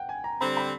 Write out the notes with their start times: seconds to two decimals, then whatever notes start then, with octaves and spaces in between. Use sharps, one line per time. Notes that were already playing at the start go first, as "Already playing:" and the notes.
Already playing: F#5 G5
0.09 G#5
0.24 A#5
0.40 D3 G3 C4 B5
0.57 B5